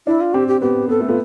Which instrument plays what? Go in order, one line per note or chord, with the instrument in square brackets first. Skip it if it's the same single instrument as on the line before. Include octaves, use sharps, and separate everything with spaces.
[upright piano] D4 [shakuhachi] E4
[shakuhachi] F4
[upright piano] C4 [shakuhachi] G4
[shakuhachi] G4
[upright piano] B3 [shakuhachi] G4
[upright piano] B3 [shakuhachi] A4
[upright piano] A3
[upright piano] B3 [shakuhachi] F4